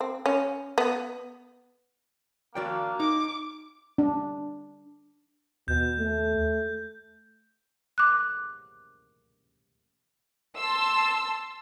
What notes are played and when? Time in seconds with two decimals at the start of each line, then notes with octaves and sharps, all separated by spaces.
0.01 C4
0.26 C#4
0.78 B3
2.55 A#3 D4 F#4 D5 F5 G5
3.00 D#4 D6
3.98 D4
5.68 D#2 B2 G6
5.99 A3
7.98 D6 F#6
10.56 A5 C6 E6